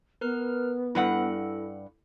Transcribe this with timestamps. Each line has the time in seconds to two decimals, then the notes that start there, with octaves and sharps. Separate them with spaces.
0.21 B3 A#4 B4 F6
0.95 G2 G3 E4 A4 F#5